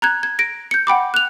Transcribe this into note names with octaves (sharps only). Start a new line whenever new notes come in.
A#5 F#6 G#6
G#6
A#6 D7
G6 C#7
F#5 G5 B5 D6
F#6 F7